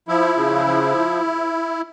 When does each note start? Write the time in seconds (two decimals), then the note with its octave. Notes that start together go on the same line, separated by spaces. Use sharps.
0.08 F3 E4
0.37 C#3
0.67 F3